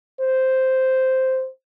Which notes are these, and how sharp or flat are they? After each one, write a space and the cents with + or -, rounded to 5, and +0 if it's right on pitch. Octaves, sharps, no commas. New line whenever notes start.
C5 -5